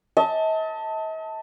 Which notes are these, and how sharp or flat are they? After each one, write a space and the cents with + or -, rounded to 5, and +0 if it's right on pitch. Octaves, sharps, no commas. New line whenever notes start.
D#5 +45 A5 +10